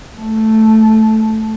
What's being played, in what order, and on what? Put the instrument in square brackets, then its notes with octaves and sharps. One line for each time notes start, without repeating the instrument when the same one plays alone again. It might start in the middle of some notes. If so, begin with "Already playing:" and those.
[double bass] A3